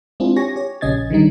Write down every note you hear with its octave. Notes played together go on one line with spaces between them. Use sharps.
G#3 C4 D4 E4 F4 G#4
G4 C#5 G#5 C#6 A#6
G4 C#5
A#1 C#3 C#4 D#5 G#6 A6
D3 D#3 G3 D#4